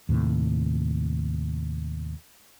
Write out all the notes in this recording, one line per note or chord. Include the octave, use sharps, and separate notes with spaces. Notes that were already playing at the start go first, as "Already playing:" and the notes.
D#2 A2 C3